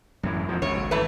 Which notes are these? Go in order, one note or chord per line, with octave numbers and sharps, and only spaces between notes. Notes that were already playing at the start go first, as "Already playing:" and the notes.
F#2 A2 E3
F2 G#2 F3
G#1 C#2 C#3 C#5
E3 A3 B4